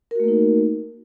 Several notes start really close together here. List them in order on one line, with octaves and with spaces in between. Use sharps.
A#4 F#4 A3 A#3 D#4